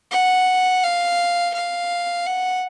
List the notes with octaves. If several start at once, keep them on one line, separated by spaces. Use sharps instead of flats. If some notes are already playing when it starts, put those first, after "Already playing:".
F#5
F5
F5
F#5